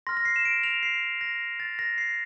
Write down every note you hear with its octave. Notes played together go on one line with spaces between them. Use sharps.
C6 F6 A#6
A#6
C7
E7
D7
F7
C7
A#6
A6
A#6
C7